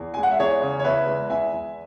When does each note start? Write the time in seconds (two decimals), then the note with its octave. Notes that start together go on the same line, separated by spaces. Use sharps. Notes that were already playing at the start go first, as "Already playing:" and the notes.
Already playing: E2 G#4
0.14 G#3 G#5
0.23 F#5
0.31 E5
0.39 E2 G#4 C#5
0.62 C#3
0.79 C#5
0.84 E2 B4 E5
1.07 G#3
1.30 E2 E5 G#5
1.53 E2